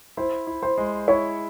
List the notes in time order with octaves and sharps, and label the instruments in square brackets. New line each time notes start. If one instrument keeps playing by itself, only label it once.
[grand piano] E4 [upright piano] C5
[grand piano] E4
[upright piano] C5
[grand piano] G#3
[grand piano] E4 [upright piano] C#5